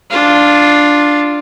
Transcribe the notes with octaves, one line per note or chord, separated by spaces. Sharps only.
D4 F4